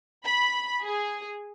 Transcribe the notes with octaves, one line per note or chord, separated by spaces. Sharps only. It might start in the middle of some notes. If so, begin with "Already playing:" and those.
B5
G#4